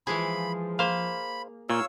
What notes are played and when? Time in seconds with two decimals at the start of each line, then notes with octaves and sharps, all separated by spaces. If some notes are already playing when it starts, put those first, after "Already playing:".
0.07 E3 F3 G#3 G#4 B5
0.79 A#3 C5 F5 B5
1.70 A#2 C#5 F5 E6